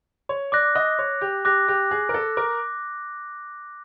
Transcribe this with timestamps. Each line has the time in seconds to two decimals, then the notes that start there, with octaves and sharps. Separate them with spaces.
0.29 C#5
0.52 D5 D6 F#6 A#6
0.75 D#5
0.99 C#5
1.21 G4
1.45 G4 D6 F#6 A#6
1.68 G4
1.91 G#4
2.09 A#4
2.14 A4
2.37 A#4 D6